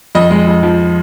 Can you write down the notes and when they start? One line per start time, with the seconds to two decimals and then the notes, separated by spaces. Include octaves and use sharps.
0.15 F2 D#5
0.31 G#3
0.47 F2
0.63 F3